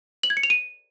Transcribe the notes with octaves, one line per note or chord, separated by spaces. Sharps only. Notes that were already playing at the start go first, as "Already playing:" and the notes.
F#7
G#6
C#7
F7
D#7